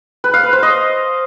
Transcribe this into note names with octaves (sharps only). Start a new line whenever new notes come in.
B4
F5
B4
C5
D#5